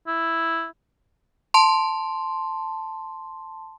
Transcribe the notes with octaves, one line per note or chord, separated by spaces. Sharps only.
E4
A5 C6